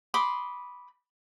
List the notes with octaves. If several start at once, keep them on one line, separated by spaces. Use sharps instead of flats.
B5 C6 D6 D#6